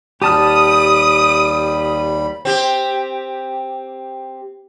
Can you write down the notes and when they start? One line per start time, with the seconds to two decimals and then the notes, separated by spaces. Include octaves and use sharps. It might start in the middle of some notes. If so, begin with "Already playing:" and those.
0.22 D#2 G3 G4 A5 B5 D#6 F6
2.45 C4 G4